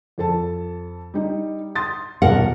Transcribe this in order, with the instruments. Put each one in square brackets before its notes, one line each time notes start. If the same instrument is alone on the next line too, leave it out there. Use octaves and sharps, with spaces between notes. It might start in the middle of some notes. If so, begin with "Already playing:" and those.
[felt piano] F2 A4 A5
G3 D#4
C6 D#6 A6
[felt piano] D#1 B2 [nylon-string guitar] A#4 F#5